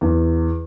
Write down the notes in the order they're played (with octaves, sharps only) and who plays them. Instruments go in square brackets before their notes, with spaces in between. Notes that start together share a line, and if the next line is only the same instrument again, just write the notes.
[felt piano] E2